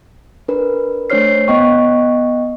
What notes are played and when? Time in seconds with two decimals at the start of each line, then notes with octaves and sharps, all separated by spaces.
0.48 D4 A#4 B4
1.10 A3 D4 C5 C#5 F6 C7
1.48 B3 D#5 G5 C#6